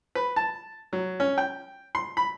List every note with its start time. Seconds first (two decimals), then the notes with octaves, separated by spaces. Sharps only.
0.15 B4
0.36 A5
0.93 F#3
1.20 C#4
1.38 G5
1.95 C6
2.17 B5